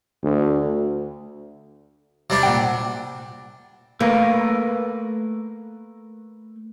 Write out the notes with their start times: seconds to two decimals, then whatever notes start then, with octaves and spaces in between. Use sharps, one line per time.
0.23 D2
2.30 C3 G3 D4
2.43 A#2 F#5 G5
4.01 A3 A#3 A#4 B4